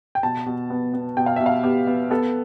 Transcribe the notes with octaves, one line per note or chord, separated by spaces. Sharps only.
G5
B2 A5
B2
B3
B3
B2 G5
F5
B2 E5
F5
B3 G4
B3
B3 A4